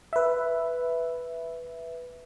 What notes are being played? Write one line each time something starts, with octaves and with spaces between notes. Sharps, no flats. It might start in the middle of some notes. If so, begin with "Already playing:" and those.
B4 E5